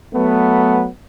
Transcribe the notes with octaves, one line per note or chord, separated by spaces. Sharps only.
F#3 A3 B3